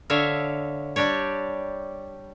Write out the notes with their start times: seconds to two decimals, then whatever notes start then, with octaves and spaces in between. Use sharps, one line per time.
0.10 D3 C#5 E5 F5
0.96 G3 D4 G4 C#5